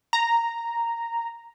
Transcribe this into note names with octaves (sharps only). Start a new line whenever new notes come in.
A#5